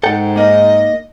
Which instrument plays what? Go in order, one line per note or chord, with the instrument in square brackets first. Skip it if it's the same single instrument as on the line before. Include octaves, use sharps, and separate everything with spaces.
[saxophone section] G#2 [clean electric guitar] A4 F#5 G5
[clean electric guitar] A#3 D#4 A#4 [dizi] D#5